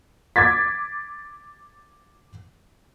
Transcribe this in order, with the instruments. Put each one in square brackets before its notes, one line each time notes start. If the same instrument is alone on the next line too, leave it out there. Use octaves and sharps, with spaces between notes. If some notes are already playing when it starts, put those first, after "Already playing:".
[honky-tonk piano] D6 G#6 A6 B6